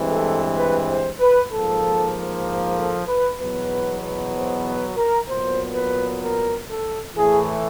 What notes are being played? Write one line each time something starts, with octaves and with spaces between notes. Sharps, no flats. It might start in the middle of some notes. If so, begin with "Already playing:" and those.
Already playing: G2 E3 G#3 C4
A4
B4
C5
B4
G#2 F3 A#3 A4
A4
B4
E2 B2 F#3 B3 B4
C5
B4
A#4
A#2 F#3 B3 C5
B4
A#4
A4
A2 E3 A3 G#4